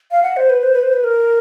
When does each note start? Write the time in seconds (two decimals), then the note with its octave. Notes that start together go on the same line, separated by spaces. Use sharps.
0.11 F5
0.23 F#5
0.37 C5
0.50 B4
0.63 C5
0.74 B4
0.83 C5
0.93 B4
1.04 A#4